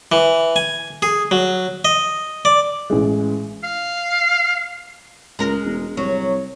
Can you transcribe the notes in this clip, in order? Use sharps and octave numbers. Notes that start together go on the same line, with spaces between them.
E3
G#5
G#4
F#3
D#5
D5
A1 G#3
F5
C#2 G#3 A#4
E1
C2 F#3